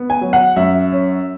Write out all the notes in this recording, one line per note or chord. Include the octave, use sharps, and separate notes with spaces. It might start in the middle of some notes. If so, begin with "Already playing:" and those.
Already playing: B3
G#5
F#3
F#5
F#2 E5
C#4